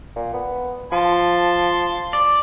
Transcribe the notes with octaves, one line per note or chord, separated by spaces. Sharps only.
A#2
B3
F3 A5 C6
D5